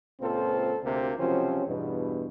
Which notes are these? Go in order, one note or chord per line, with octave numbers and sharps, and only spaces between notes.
C#2 A#2 C4 F4 A4 C5
D2 C3 A#3
C#2 C3 F3 F#3 C4 C#4
E2 G2 B2